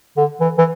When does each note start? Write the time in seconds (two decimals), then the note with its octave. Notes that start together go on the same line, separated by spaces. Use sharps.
0.17 D3
0.40 E3
0.58 E3